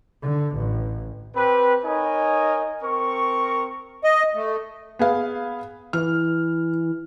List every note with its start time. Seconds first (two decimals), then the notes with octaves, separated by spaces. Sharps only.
0.23 D3
0.56 A1
1.36 C4 G4 B4
1.85 D#4 A#4 C#5 D#5 G#5
2.83 C4 A#4 C#6
4.04 D#5
4.35 A3
4.99 B3 G#4 F5
5.93 E3 F6